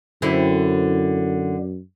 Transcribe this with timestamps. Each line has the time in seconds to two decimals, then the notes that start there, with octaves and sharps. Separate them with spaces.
0.22 F#2 D3 C4 E4